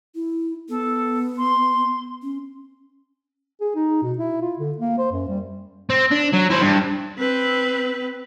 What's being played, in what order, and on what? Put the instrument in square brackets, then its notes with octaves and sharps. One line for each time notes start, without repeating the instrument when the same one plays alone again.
[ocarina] E4
[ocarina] B3 [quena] A4
[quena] C6
[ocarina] C#4
[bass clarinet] G#4
D#4
B2
E4
F4
D3
A#3
C5
F#2
G3
[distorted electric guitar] C4
D4
F#3
E4 C5
G2
[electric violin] C4 B4